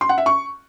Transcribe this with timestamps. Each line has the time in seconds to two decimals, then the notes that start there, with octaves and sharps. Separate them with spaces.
0.01 C6
0.09 F#5
0.18 E5
0.26 C#6